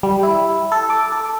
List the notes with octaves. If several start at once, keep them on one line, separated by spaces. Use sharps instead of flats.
G3
E4
A4
D6
A4